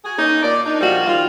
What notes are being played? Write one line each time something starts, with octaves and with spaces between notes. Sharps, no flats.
F#4 G#4
A#3 C#4 D#4
A#2 D5
D4 D#4
A#2 F3 G3 F4 F#4
D#3 G3 F4